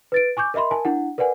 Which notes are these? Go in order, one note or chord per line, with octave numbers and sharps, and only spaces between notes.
B4 A6 D7
G#5 C#6 D6 G6
A#4 D#5 E5 B5 C6
A#4 G#5 A5
D4 E4 F#5
A#4 B4 D5 F#5 G#5